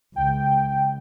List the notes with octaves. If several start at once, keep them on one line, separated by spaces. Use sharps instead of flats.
C#2 G5